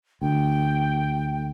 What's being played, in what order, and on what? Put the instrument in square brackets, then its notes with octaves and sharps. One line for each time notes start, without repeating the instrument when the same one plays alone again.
[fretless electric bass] D2 [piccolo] G5